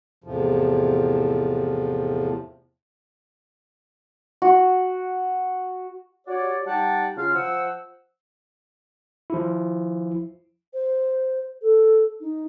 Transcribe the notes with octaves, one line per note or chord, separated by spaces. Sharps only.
E2 A2 C3 F3
F#4
F#4 G4 C#5 D5
G3 D#4 D5 F#5 G5 A5
C#3 F4 F5
F3 C5 F#5 E6
F3 E4
C5
A4
D#4